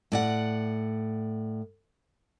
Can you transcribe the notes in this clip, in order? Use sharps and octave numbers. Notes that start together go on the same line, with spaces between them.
A2 D5 F#5